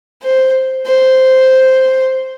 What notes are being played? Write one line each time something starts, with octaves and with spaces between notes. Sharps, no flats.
C5
C5